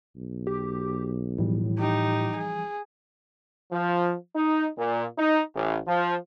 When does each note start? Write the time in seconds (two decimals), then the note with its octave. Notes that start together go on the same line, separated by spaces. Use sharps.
0.16 B1
0.47 G4
1.38 A2 E3 F3 G3
1.79 D#4 G4
2.37 G#4
3.72 F3
4.35 D#4
4.78 A#2
5.18 D#4
5.55 A1
5.87 F3